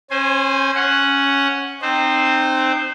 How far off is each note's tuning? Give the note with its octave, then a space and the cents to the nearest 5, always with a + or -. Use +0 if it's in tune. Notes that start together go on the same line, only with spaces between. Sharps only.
C#4 -30 C5 +0 G#5 +0
C#4 +0 F#5 +0
C4 +0 D#4 -30 C5 +0